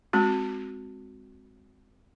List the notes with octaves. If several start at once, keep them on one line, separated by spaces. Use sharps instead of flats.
G#3 C4 F#4